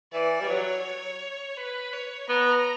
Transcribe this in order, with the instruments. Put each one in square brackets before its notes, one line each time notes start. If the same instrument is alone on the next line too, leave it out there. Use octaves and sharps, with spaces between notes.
[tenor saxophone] E3 [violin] D5
[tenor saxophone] G3
[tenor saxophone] F#3 [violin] C#5
[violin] B4
C#5
[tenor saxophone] B3 [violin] A#5